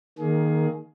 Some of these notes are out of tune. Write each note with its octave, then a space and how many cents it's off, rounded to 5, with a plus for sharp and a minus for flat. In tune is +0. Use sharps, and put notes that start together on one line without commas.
D#3 +0 A#3 +10 G#4 +20